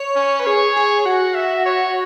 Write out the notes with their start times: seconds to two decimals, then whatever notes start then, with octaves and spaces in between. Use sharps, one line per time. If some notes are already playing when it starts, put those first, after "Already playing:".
Already playing: C#5
0.16 C#4
0.40 B4
0.46 G#4 C#5
0.76 G#4
1.06 F#4 F#5
1.35 E5
1.66 C#5